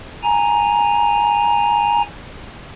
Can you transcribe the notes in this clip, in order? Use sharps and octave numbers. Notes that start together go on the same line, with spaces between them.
G#5 A#5